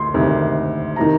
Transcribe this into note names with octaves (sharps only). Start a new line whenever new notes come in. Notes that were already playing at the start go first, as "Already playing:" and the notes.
Already playing: D2 C6
D2 C3 D#3
C3 D#3 A#5